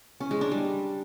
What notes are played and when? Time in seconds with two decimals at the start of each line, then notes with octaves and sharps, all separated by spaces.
0.20 C#4
0.31 G#3
0.41 D4
0.51 G3